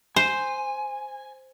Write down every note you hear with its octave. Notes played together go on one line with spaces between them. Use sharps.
C5 G#5